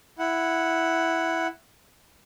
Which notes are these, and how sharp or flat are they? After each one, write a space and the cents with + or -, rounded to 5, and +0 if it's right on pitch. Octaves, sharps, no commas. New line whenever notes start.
E4 +0 F#5 +0